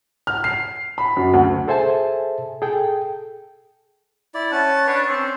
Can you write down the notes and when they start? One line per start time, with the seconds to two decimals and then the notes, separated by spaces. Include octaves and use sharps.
0.27 F6
0.44 C7
0.98 B5
1.17 F#2
1.33 D2
1.68 G#4 A4 C5 E5 G#5 A5
2.62 G#4 A4 G5
4.34 E4 D5
4.52 C#4 F#5 A5
4.87 D4 B4 C#5
5.09 C4 C#4